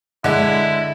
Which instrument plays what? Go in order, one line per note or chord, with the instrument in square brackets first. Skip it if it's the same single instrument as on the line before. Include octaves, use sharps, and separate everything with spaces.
[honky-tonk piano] D3 G#3 [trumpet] E4